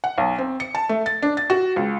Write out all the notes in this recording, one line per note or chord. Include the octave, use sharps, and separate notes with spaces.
F#5
B1
C4
C#7
A5
A3
A6
D4
A6
F#4
C#2